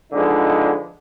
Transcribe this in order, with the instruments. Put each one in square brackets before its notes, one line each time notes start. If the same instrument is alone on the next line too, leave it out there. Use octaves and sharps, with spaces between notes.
[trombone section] D3 F3 G#3 B3 D#4